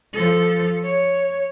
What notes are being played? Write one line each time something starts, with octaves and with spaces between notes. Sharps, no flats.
F3 A4
C#5